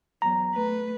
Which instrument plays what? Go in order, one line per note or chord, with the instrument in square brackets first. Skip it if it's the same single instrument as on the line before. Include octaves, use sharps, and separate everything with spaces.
[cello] E2 F#3 [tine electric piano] A#5
[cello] A3 B4